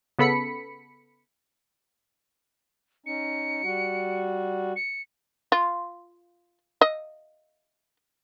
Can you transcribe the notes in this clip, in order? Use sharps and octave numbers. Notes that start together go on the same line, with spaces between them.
C#3 B3 A4 B5 B6 C#7
C#4 D#4 C#7
G3 F#4
C#7
F4
D#5